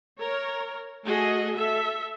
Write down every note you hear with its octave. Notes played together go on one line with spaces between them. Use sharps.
A#4 C#5
A3 F#4 G#4 D#5
A4 E5